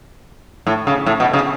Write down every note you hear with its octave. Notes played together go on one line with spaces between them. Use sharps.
A2
C#3
A2
B2
C#3